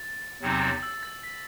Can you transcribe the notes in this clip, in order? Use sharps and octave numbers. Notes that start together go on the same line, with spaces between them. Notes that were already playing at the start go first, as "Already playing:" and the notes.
Already playing: A6
E2 C3 F#3 C4 D#4
A6
E6
A6
B6